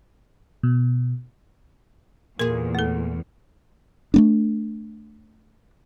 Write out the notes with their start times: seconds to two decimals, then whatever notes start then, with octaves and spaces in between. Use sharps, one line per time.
0.63 B2
2.39 E2 A#2 G#4 A#4
2.75 A3 A4
4.14 A3 B3 D4